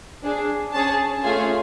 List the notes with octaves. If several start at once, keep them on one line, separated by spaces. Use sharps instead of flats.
D4 G#4
C#4 G#4 A5
A3 C#4 F4 G#4 G#5